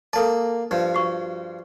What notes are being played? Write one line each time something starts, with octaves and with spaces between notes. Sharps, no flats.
A#3 A4 D5 A5
G2 F3
F#4 C#6